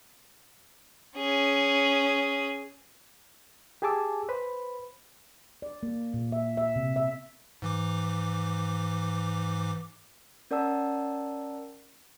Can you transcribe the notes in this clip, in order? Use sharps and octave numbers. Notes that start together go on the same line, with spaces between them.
C#4 G#4
G4 G#4 G#5 A5 D6 E6
B4 C5 B5
D5
A#3
A#2
E5
E5
C3
E5
G#2 E3 D6
C#4 A#4 D5 F#5 A5 E6